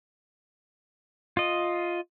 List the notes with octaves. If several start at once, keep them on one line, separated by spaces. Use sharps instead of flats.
F4 D#5